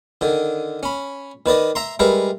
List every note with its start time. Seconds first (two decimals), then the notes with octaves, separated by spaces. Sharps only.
0.21 D3 D#3
0.83 C#4 B5
1.46 D#3 B4 D5 D#5
1.75 E5 A#5 C6
1.99 G3 G#3 A#4 B4 E5